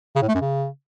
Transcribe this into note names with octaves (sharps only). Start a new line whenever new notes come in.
C#3
A2
A3
F#2
C#3